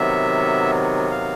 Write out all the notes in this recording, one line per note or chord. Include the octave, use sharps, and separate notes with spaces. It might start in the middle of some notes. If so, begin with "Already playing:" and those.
Already playing: C3 D#3 F#3 B3 E5
F5